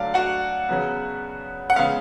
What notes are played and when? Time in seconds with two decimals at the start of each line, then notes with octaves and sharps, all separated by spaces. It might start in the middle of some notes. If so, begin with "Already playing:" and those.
Already playing: D3 F#3 A3 D5 F5
0.14 F#4 F#5
0.69 C#3 F#3 B3
1.70 F#5
1.76 C#3 G#3 B3 F5